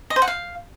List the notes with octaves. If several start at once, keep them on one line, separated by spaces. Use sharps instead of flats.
D#5
C5
F#5
F5